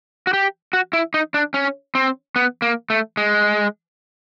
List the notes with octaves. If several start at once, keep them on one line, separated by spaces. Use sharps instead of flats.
F#4
G4
F#4
E4
D#4
D4
C#4
C4
B3
A#3
A3
G#3